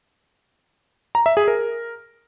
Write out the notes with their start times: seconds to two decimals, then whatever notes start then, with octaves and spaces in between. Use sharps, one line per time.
1.15 A#5
1.26 E5
1.37 G#4
1.48 A#4